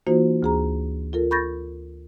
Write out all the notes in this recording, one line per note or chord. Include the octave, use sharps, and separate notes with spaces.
E3 A#3 D#4 F4 F#4 C5
D2 G#4 A#5
F4 A4 A#4
B5 C#6 G6 A6 A#6